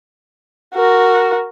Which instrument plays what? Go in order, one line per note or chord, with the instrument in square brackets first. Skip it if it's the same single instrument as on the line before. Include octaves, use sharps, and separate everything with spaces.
[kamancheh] F#4 A#4